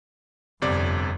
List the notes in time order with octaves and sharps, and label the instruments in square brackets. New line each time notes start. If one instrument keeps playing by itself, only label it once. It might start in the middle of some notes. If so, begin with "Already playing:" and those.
[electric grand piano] G1 C3 D5 [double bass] F2